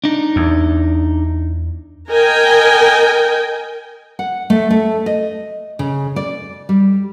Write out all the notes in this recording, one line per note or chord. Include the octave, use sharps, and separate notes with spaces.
D4 D#4
E2
A#4 D#5 G5 G#5
F#5
A3
A3
D#5
C#3
D5
G3